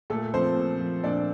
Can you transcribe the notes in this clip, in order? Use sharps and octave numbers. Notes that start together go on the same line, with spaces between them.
A#2 A3 A4
F3 C4 C5
A#2
F3
A#2 D4 D5